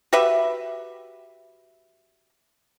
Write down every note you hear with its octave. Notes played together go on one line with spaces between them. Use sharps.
F#4 G4 B4 E5